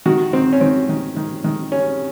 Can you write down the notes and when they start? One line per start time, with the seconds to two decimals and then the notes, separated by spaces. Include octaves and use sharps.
0.06 D#3 F#4
0.33 D#3 C4
0.53 C#4
0.61 D#3 C4
0.89 D#3
1.16 D#3
1.44 D#3
1.72 G3 C#4